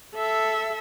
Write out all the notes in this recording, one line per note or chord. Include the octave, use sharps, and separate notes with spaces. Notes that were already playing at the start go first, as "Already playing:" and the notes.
A4 E5